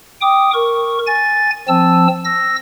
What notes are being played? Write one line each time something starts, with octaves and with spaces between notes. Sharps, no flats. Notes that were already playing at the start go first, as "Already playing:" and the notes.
G5 D6 D#6
A#4 C#6
G#5 A6
F3 C4 A5 E6
E6 A#6